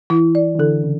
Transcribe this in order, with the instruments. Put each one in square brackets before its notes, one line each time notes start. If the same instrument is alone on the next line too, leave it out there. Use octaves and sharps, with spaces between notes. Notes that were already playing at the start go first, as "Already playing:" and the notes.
[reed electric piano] E3 [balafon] E4
[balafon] D5
[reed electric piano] E3
[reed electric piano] D3 [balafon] A4
[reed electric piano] C#3